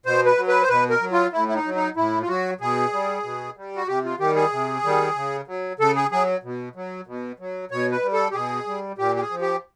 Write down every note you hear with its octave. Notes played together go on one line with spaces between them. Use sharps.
B2 C5
B4
F#3
B4
C5
B2 B4
A#4
F#3
F4
A2 E4
E4
D#4
F#3
D#4
A2 E4
F4
F#3 F#4
B2 G#4
G3
B2
G3
F#4
C3 G4
F4
D#3 G3 G4
G#4
C3
D#3 G3
C#3
F#3
C#3 A4
G#4
F#3 G#4
B2
F#3
B2
F#3
B2 C#5
B4
G3
A4
G4
B2 G#4
G3
A#2 G4
G4
G#4
F3
G4